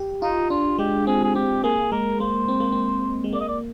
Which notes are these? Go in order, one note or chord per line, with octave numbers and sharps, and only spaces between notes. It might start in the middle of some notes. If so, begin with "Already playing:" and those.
Already playing: G4
D#4 F4
D4 F4
G#3 G4
C4 G#4
G#4
C4 G4
A#3 G#4
G#3 A#4
A#3 C5
C4
A#3
C4
G#3
A#3 D5
D#5
D5